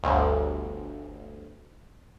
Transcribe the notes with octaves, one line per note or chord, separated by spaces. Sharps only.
G1 D2